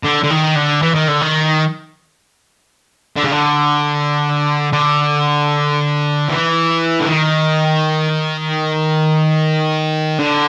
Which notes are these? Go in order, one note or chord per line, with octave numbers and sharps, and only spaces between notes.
D3
D3
D#3
D3
E3
D#3
D3
D#3
D3
C#3
D3
D3
E3
D3
D#3
D3